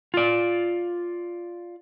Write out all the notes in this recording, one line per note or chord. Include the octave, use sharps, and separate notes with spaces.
F4 D5